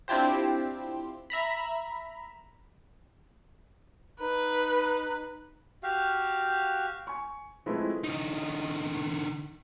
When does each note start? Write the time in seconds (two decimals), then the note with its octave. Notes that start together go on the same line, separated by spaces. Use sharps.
0.08 C4 D4 E4 F4 G4 C5
1.30 E5 A#5 B5
4.21 D#4 B4
5.83 F#4 G4 F5
7.07 G#5 C#6
7.66 F3 G#3 A3 C4 E4 B4
8.04 D3 D#4